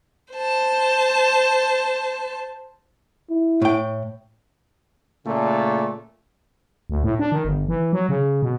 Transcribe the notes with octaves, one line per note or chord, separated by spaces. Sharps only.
C5 A5
E4
A2 G5
A#2 C#3 A3
D2
A2
D4
D#3
G1
E3
F#3
C#3
B2